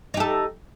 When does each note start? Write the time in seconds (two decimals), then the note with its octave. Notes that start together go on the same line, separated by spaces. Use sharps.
0.14 D#4
0.17 G4
0.20 A4